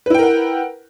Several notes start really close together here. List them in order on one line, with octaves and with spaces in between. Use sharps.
B4 E4 G5 A#4 F#5